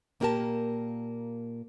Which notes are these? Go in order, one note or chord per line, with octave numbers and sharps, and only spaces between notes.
A#2 A#3 D4 G4 A#4 A5